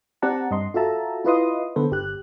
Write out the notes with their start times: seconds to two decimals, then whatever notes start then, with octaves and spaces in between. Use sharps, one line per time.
0.22 C4 G4 D5 F#5 A5 A#5
0.51 G2 D#5 C6
0.74 F4 F#4 A4 E5 A5 A#5
1.25 E4 F4 B4 D#5 C6 D#6
1.76 D3 B3 A4 B4 C5
1.91 G1 G4 F#6